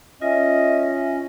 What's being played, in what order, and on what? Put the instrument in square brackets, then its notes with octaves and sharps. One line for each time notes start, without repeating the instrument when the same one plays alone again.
[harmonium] C#4 [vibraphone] F4 [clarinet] D#5 [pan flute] E5